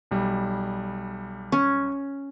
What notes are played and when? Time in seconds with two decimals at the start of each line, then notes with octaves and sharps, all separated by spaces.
0.11 B1 G3
1.52 C#4